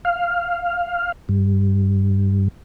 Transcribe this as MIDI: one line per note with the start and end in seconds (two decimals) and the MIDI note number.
0.05 1.12 77
1.29 2.48 43